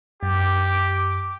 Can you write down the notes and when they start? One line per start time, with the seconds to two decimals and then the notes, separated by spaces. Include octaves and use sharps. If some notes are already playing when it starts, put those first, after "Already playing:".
0.23 F#2 G4 D6